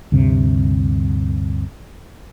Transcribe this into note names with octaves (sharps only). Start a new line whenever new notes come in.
D2 G2 C3